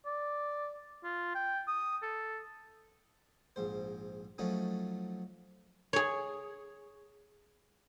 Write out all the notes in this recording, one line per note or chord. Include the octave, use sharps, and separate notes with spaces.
D5
F4
G5
D#6
A4
A#1 G#2 C5
F3 F#3 A3 C#4 D#4
G#4 C#5